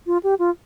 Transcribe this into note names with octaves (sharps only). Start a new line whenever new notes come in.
F4
G4
F4